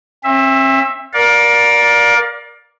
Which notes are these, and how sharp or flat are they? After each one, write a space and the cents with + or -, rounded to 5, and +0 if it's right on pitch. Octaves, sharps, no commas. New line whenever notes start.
C4 +45 E5 +0
A#4 +25 D5 +0 F5 +30